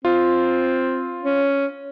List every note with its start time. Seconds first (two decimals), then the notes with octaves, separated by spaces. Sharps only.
0.05 C4 F4
1.22 C#4